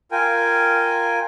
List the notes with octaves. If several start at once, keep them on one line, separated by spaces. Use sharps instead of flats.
F4 A#4 G5 G#5